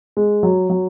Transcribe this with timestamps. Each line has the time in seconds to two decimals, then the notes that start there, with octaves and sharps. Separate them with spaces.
0.17 G#3
0.43 F#3
0.70 F#3